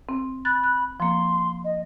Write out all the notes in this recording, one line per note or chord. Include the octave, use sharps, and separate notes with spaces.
C4
B5 F#6 A6
F#6
F3 A#3 C6
D#5